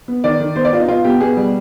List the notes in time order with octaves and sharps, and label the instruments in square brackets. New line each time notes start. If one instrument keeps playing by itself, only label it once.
[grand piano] B3
D#3 D5
D#3
B3 C5
D5
B3 F4
D#4
B2 F4
B3 G4
B2 G#4
G3